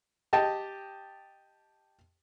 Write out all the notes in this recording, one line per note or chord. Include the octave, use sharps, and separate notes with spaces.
G4 D#5 A5